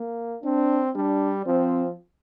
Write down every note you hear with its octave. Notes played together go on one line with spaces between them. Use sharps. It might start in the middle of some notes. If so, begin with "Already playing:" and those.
Already playing: A#3
C4 D4
G3 D4
F3 C4